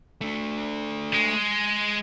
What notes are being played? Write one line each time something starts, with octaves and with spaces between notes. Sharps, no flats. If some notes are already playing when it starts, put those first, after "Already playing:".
A3 D4
G#3